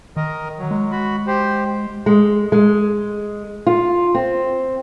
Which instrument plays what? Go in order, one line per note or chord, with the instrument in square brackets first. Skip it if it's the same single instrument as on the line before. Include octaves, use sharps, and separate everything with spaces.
[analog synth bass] D#3 [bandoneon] A#4 D#5
[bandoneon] F#3
[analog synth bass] G#3
[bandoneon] F#4 B5
G4 C5
[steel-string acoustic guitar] G#3
G#3
F4
C4